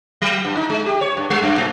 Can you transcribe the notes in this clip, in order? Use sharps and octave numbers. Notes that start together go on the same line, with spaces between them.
F#3
G2
D#4
G#3
G4
C#5
G2
G3
F#2
A2